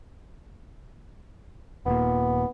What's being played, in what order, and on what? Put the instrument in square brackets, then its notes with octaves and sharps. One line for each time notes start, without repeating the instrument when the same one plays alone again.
[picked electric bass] D#1 A#2 [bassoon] B3